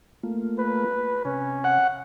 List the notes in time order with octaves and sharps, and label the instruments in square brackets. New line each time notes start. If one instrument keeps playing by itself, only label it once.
[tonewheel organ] A3 A#3 F4
[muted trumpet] B4
[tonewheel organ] C3 [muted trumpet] C#4
[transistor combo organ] F#5